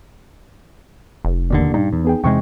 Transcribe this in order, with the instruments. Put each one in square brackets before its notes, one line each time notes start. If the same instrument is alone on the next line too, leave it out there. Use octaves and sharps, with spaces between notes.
[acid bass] F1
[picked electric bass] E1 D#2 D3 [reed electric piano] A#3 D5
[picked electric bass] G2 [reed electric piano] A#2 [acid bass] D#4
[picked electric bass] E2
[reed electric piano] B3 G#4 G5
[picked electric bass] E2 C3 G#3 [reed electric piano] G5 C#6